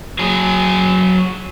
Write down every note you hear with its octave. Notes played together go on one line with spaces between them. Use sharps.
F#3 G#4